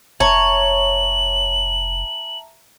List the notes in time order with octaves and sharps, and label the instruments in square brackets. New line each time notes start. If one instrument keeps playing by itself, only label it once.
[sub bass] F1 [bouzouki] C#5 [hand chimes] E5 A5 A#5 [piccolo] F#7